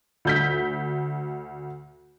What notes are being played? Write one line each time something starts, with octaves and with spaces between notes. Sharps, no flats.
D2 G6 B6